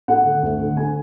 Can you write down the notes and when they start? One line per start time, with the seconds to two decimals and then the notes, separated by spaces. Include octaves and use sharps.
0.08 A3 F#5
0.25 D3
0.43 D2
0.60 D3
0.77 A3 G#5